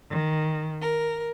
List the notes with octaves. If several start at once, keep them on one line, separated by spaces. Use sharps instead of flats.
D#3
A#4